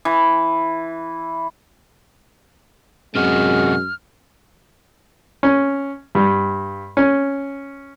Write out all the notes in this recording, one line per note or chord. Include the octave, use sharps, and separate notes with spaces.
E3
F#2 C3 G#3 F#4 F6
C#4
G2
C#4